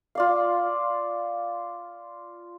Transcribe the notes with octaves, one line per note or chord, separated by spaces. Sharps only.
F4 D5 F5